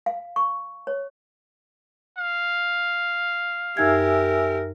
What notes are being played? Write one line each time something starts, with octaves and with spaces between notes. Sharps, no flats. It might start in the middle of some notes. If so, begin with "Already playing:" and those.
F5
C#6
C#5
F5
F#2 D#4 G4 A#4 E5 G#5 E6 G#6